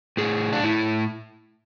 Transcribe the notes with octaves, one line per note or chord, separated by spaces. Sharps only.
A2 G#4
D4
A2 E4